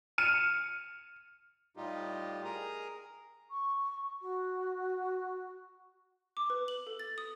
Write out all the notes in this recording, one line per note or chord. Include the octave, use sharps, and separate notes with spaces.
F6 C#7 D#7 E7
A2 G3 D#4 F4 G4
G#4 A#4 A#5 D#6
C#6
F#4
D6
B4
F#7
A4
A6
D#6